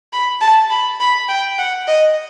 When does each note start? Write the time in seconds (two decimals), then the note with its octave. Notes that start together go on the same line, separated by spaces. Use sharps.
0.13 B5
0.41 A5
0.70 B5
1.00 B5
1.29 G5
1.58 F#5
1.87 D#5